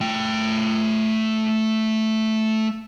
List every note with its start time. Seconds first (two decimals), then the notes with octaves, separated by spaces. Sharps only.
0.01 A3 G5